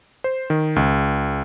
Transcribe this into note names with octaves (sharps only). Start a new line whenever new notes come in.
C5
D#3
C#2